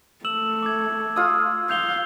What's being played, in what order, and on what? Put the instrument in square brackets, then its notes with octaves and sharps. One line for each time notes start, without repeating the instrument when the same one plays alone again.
[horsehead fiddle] A3 [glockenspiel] E6 E7 F#7
[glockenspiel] D6 G#6
[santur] F4 D#6 [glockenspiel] E6
[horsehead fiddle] F5 [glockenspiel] G6 F7 G7